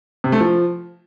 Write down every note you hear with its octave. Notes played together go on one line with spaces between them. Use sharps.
C3
A3
F3